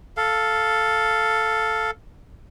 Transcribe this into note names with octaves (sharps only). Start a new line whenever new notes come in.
A4 F5